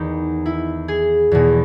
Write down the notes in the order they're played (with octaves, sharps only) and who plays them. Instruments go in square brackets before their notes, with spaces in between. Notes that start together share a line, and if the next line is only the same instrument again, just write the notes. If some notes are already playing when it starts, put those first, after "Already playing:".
Already playing: [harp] E2 D#3 D#4
E4
G#4
E2 B2